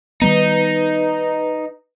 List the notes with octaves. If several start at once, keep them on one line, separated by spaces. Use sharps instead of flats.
D#3 G3 B3 D#4 B4